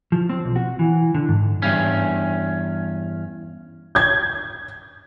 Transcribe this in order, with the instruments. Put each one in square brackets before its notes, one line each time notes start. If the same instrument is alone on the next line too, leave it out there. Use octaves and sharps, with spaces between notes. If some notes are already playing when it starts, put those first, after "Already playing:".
[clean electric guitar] F3
C4
B1
F#4
E3
D3
G#2
E2 G2 C#4
[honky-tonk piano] G6 G#6